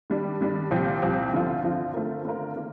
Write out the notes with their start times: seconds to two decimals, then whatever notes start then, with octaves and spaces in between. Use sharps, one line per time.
0.10 D#3 G3 D4
0.41 D#3 G3 D4
0.71 C2 A#2 F3 C4 G4
1.02 C2 A#2 F3 C4 G4
1.32 D2 D3 F3 C4 F4
1.63 D2 D3 F3 C4 F4
1.94 D3 A3 C4 F4 A#4
2.25 D3 A3 C4 F4 A#4
2.56 D#3 A#3